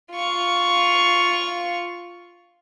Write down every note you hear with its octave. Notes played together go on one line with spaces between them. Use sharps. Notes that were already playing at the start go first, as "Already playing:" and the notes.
F4 C#6